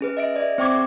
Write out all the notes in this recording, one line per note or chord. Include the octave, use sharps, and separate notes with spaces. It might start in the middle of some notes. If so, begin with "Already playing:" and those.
C#4 G#4 B4
D#5 E5 D7
G#4 D5 E5
C4 C5 G5 C#6 D6 G#6